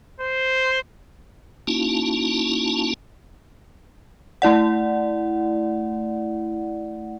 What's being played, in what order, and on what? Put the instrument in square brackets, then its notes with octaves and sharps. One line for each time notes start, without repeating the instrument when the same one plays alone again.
[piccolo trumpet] C5
[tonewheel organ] A#3 C#4 D#4 E4 F#4 A5
[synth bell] A3 E4 D5 F#5